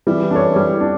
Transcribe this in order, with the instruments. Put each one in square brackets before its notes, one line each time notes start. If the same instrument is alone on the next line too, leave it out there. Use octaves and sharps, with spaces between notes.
[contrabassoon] E3 [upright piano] G3
[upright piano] D4 A4 C#5
G3
D4